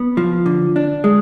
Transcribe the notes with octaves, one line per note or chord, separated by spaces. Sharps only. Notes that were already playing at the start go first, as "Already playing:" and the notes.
Already playing: B3
F3
D3
D4
G#3